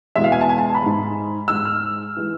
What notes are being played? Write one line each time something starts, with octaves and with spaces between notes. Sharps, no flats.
E2 B2 G#3 E5
F5
G#5
A5
G#5
A5
B5
G#2 G#3
G#2 G#3 E6
F6
E3 G#3